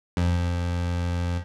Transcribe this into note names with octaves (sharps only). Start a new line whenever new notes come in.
F2